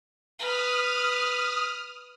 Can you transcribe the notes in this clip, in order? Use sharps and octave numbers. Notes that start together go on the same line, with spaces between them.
B4 D#6 F6